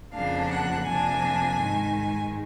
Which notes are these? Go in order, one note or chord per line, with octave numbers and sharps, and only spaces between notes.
F2 C#3 F3 A#3 D4 F5
F#5
F2 C3 F3 A#3 D4 G#5
G#2 D#3 G#3